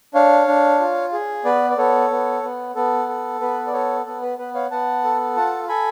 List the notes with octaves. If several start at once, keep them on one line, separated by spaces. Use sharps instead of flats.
D4 C#5 F5
D4
F4
G#4
B3 B4 D5
D5
B3 A4 C#5
B3
B3
B3 A4
A4
B3 B4
D5
A4 C#5
B3 A4
B4
B3 B4
C#5 F5
B3 F#5 A5
A4
F4 F#5 A5
A4 G#5 B5